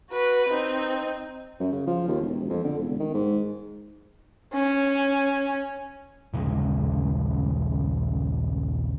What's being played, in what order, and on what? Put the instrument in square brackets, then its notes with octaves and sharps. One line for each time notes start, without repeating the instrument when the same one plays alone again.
[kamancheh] F#4 B4
C4 D#4
[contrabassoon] F#2
C#3
F3
D#2
E1
F2
D3
E1
D#3
G#2
[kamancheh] C#4
[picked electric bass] A#1 D#2 C#3 G#3